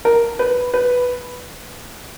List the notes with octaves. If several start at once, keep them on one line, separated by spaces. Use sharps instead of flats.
A#4
B4
B4